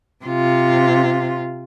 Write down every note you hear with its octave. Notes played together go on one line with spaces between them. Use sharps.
C3 F4